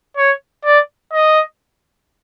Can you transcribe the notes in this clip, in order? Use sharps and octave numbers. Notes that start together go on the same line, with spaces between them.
C#5
D5
D#5